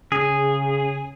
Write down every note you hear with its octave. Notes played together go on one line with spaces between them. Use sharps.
C#3 G#4